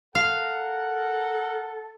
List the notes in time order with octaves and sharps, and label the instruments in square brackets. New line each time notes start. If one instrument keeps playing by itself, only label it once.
[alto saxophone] A4 [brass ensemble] A#4 F#5 [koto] F5